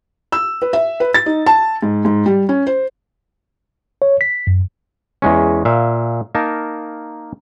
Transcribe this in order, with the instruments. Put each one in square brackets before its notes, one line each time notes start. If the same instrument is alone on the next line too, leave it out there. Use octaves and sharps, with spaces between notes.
[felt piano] E6
B4
E5
B4
A6
D#4
A5
G#2
G#2
G3
C#4
C5
[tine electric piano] C#5
B6
F#2
[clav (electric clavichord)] E2 G#3 C#4
A#2 E5 F5
A#3 D#4 A#4 A5